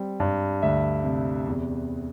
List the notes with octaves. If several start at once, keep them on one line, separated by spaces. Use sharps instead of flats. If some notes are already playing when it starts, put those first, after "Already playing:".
Already playing: G3 C4
G2
D2 E5
C3
E2